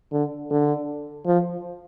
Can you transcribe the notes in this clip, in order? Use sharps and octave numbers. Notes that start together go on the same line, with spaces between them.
D3
D3
F3